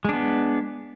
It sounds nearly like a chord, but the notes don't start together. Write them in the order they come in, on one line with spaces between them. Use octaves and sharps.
G#3 D4 B3